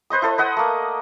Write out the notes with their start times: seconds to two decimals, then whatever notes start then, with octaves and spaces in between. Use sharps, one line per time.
0.10 B4 C5 D#5 D#6
0.22 E4 A4 C5
0.38 B4 D#5 F#5 D#6
0.57 A3 A#3